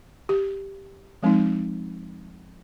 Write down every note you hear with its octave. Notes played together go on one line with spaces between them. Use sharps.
G4
F3 G#3 C4 D#4